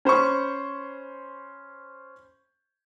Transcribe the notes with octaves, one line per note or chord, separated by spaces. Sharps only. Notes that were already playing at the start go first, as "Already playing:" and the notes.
C#4 C5 B5 C#6